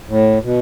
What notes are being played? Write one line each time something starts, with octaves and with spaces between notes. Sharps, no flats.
A2
B2